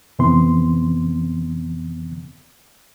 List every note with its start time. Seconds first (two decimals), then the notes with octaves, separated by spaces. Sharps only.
0.19 F2 C3 E3 B3 C4 C6